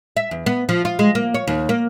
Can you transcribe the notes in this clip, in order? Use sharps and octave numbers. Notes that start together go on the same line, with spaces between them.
E5
E2
B3
F3
F4
G#3
A#3
C#5
D#2
A#3